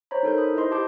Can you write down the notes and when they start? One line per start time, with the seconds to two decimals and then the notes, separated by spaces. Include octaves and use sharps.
0.11 C5 C#5 A#5 B5
0.23 D#4 A4 A#4 G6
0.38 B5 D#6
0.54 E4 B4 C5 D#5 C6
0.71 G4 D#5 A5 D6 G6